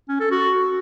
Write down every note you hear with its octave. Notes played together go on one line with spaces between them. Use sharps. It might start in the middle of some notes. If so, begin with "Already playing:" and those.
C#4
A4
F#4